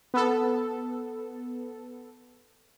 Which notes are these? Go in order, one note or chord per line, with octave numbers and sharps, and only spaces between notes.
B3 A4